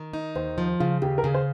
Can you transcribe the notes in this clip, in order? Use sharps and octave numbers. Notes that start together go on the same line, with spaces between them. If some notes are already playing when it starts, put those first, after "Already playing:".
Already playing: D#3
D#4
D#2 C5
F3
C#3 F4
D#2 G4
A#4
C#3 G#4
C5